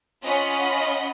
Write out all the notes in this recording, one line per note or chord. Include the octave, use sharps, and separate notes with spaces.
C#4 F4 D#5 F#5 B5